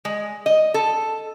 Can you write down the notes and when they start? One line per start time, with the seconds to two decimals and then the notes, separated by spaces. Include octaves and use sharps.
0.05 G#3
0.46 D#5
0.74 A4